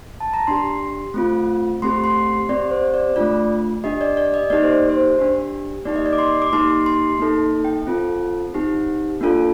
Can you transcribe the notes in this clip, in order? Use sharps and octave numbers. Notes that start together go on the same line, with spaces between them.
A5
A#5
D4 G4 C6
A3 C4 F4
A3 C4 G4 C6
C6
C4 G4 D5
C5
D5
A3 D4 F4 D5
D4 G4 D#5
D5
D5
D#5
A#3 D#4 G4 D5
C5
C5
D4 G4
A#3 D#4 G4 D5
D#5
D5
D6
C6
D6
A#3 D#4 G4 C6
C6
A#3 D#4 A4
G5
C4 F4 A4
C4 D#4 G4
A#3 D4 F4 A4